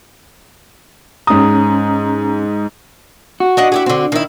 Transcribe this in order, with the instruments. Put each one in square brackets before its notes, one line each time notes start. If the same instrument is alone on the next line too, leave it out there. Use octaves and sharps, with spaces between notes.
[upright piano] G#2 D#6 [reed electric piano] C#4 A#5
[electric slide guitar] F#4
[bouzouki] D4 D#5 F#5
E4 G4 G#4
D3 C4
D#3 E4